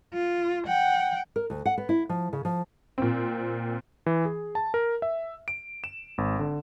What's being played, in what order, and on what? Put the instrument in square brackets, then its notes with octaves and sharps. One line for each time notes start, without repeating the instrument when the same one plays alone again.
[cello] F4
F#5 G5
[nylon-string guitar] A#4
D2
F#5
B3
E4
F3
C#3
F3
[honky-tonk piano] A#2 C4
[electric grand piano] E3
G#4
A5
A#4
E5
D7
E7
G#1
D3